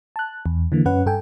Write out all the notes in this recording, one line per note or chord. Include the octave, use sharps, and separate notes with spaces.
A5 F#6
E2
D3 E3 A#3
F#2 C#4 B4 F#5
G2 A4 G5 G#5